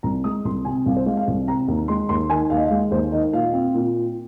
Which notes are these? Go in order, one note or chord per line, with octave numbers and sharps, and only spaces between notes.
C2 A#5
G#3 D#6
C2 C6
C3 G#5
C2 F5
C5
G#3 F5
F5
C2
C3 A#5
D#2
G#3 C6
D#2 C6
D#3 G#5
D#2 F5
D#5
F5
G#3
D#2 C5
D#3 D#5
A#2 F5
C4
A#2